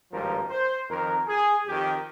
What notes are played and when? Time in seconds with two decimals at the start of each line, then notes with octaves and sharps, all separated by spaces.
0.10 G#1 G2 F3 A#4
0.49 C5
0.88 F2 D#3 A#4
1.27 G#4
1.66 F2 D#3 G4